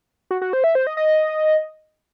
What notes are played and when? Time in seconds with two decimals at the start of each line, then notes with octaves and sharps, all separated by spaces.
0.31 F#4
0.42 F#4
0.53 C5
0.64 E5
0.75 C5
0.87 D#5
0.97 D#5